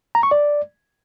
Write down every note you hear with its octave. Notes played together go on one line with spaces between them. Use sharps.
A#5
C#6
D5